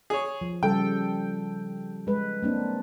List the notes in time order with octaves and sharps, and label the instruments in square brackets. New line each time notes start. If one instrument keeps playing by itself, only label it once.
[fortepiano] G#4 C#5
[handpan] F3
[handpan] C#3 G3 A4 [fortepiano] G5
[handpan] G#3 B4
A#3 C4 D4